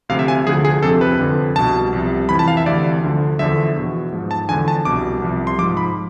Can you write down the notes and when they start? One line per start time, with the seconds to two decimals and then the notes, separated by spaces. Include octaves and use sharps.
0.09 D2 C3 F3 F5
0.19 E5
0.28 G#5
0.47 D2 D3 F3 G#4
0.65 G#4
0.83 F2 C3 F3 A4
1.01 B4
1.19 F2 D3 F3
1.56 C2 B2 A5
1.93 C2 C3 F3
2.29 F2 E3 B5
2.39 A5
2.48 F5
2.57 E5
2.66 D2 C3 E3 D5
3.03 D2 D3 F3
3.39 E2 D3 F3 E5
3.76 E2 B2
4.12 G#2 F3
4.31 A5
4.48 E2 D3 F3 G#5
4.68 A5
4.85 C2 B2 D6
5.22 C2 C3 F3
5.47 C6
5.58 G#2 F3 D6
5.77 B5